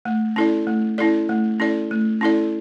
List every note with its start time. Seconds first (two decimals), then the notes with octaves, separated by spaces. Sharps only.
0.05 A3
0.36 C#4 E4 A4 D5
0.67 A3
0.98 C#4 E4 A4 D5
1.29 A3
1.60 C#4 E4 A4 D5
1.91 A3
2.21 C#4 E4 A4 D5